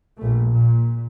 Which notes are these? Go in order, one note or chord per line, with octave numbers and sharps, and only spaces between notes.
A#1 A3
A#2